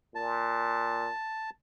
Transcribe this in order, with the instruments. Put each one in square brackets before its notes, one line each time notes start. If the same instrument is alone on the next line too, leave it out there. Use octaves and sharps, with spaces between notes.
[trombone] A#2 [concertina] A5